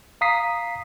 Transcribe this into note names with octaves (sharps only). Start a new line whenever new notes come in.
F5 A#5 D#6 B6 C7